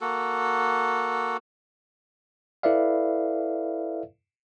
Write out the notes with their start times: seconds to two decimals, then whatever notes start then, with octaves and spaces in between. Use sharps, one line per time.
0.01 A#3 F#4 A4
2.63 E4 A4 B4 D5 E5 F5